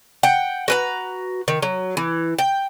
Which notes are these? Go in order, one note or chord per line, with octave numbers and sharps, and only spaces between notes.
F#5 G5
F#4 B4 A#5
D#3
F#3
E3
G5